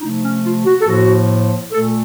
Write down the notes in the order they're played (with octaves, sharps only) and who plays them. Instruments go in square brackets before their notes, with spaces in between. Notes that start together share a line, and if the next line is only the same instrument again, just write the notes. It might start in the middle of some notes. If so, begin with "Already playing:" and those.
[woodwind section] C3 F3 A3 D#4
C#4
F4
F#4
A4
A2 F3 A#3 F#4
A#2 A3 A4